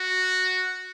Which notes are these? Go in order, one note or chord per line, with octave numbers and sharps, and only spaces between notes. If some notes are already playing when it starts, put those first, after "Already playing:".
Already playing: F#4